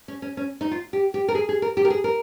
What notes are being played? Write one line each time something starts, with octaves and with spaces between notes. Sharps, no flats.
C#4
C#4
C#4
D#4
F4
G4
G4
A#4
G#4
G#4
A#4
G4
A#4
G#4
A#4